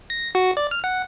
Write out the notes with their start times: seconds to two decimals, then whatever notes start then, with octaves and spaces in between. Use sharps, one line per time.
0.10 A#6
0.35 F#4
0.57 D5
0.71 F6
0.84 F#5